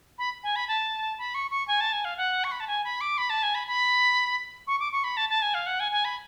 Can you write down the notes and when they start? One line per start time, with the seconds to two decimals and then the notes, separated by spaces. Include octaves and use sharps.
0.18 B5
0.43 G#5
0.56 B5
0.68 A5
1.18 B5
1.35 C#6
1.51 C#6
1.68 G#5
1.81 A5
1.93 G#5
2.05 F5
2.17 F#5
2.44 C#6
2.52 B5
2.60 A5
2.67 G#5
2.85 B5
3.01 D6
3.18 B5
3.30 A5
3.43 G#5
3.55 B5
3.68 B5
4.67 C#6
4.80 D6
4.92 C#6
5.04 B5
5.17 A5
5.29 A5
5.42 G#5
5.54 F5
5.66 F#5
5.80 G#5
5.92 G#5
6.05 B5